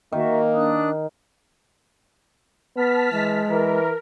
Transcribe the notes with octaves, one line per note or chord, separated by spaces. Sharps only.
D#3 A#3 F#4 E5
D4 D#6 F#6
B3 A5 F6 B6
E3 G#3
E3 A#4